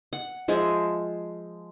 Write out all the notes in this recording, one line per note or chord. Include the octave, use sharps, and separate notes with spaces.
F#5
F3 G#3 E5